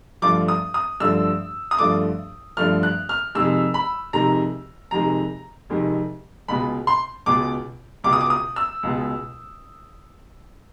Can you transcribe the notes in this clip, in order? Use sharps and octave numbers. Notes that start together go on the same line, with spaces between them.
G2 D3 F3 A3 D6
D#6
D#6
G2 D3 F3 A3 E6
D#6
G2 D3 F3 A3 D6
G2 D3 F3 A3 F6
F#6
F6
F2 C3 D#3 G#3 E6
B5
F2 C3 D#3 G#3 A#5
F2 C3 D#3 G#3 A#5
F2 C3 D#3 G#3
C#2 B2 G#3 B5
C6
C#2 B2 G#3 D6
C#2 B2 G#3 D6
D#6
D6
D#6
E6
C#2 B2 G#3